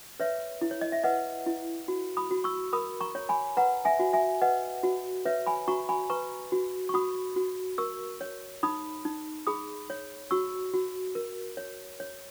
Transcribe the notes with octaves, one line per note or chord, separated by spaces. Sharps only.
B4 C#5 E5
E4
C#5
D#5
E5
B4 D#5 F#5
E4
F#4
B5 D#6
F#4
C#6 E6
A#4 B5 D#6
A#5 C#6
C#5
G#5 B5
B4 F#5 A#5
E5 G#5
F#4
E5 G#5
B4 D#5 F#5
F#4
B4 C#5 E5
G#5 B5
F#4 A#5 C#6
G#5 B5
B4 A#5 C#6
F#4
C#6
F#4 B5 D#6
F#4
A#4 C#6 E6
C#5
D#4 B5 D#6
D#4
G#4 B5 D#6
C#5
F#4 C#6 E6
F#4
A#4
C#5
C#5